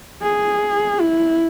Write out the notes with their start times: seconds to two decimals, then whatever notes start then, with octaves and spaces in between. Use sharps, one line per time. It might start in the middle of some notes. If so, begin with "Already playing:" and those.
0.22 G#4
1.01 E4